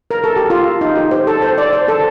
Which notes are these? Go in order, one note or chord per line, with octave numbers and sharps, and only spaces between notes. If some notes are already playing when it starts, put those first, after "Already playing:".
A#4
A4
G4
F4
D#4
G4
C5
A4
C5
D5
C5
A4